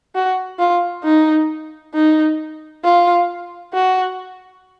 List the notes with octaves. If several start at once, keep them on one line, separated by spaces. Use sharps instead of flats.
F#4
F4
D#4
D#4
F4
F#4